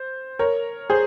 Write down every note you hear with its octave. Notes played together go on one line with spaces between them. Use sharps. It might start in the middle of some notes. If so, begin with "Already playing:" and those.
Already playing: C5
A#4 C#5
G#4 C5